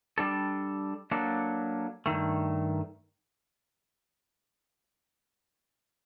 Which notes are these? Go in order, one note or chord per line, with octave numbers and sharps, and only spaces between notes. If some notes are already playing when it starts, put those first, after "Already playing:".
G3 D4 A4
F#3 A#3 D4 A4
G2 D#3 A3